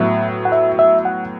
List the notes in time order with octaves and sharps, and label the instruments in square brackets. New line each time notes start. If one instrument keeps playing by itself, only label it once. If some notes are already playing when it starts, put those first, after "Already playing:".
Already playing: [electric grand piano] A2 F#3 B3 [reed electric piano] E5
[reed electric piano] F#5
E5
E5
F#5